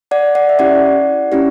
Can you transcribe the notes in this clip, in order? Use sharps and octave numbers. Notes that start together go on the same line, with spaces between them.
D5 F#5
D5 F#5
E5
C#4 E4 G4 D5 F#5
C#4 E4 G4